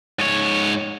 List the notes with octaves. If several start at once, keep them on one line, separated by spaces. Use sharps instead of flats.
G#2 C#5